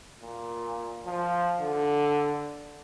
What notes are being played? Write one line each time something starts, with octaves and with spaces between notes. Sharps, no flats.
A#2
F3
D3